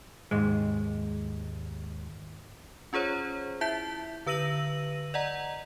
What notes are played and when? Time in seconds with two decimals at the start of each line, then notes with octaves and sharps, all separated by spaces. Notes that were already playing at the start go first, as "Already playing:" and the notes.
0.31 D#2 G#2 G#3
2.93 C#4 F4 G#4 C5 C#5
3.61 E4 E5 A5 G6 B6
4.26 D3 B4 E6 A#6 D#7 F#7
5.14 D5 D#5 F#5 A#5